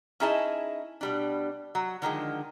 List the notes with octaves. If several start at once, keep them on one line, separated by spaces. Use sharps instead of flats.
C#4 D#4 E4 G#4 D#5 A5
B2 G3 D4
F#3
D3 D#3 F3 G#3